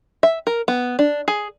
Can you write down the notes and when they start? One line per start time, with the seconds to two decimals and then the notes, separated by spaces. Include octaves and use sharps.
0.23 E5
0.47 A#4
0.68 B3
0.99 D4
1.28 G#4